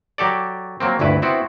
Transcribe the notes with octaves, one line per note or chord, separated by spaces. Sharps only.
F#3 G4 A4 D5
F#3 A#3 C4
G1 D2 G2 E4 B4
B3 C4 E4 F#4